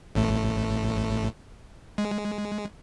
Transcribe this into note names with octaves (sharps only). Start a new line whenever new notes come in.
A1 A2 A3
G#3